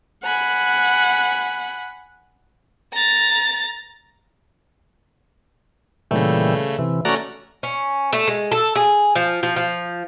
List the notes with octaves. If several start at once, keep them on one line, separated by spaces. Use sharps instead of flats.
F#5 G#5 B5
A#5 A6
A#2 C#3 E3 G3 A3
C3 E3
A3 C#4 F#4 D5 A#5
C#4
A3
G#3
A4
G#4
F3
F3
F3